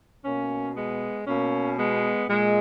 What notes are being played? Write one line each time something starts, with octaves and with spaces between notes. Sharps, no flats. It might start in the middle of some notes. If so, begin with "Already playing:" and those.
B2 A#3 C#4
G#3 B3
B2 A#3 C#4
G#3 B3
A#2 G#3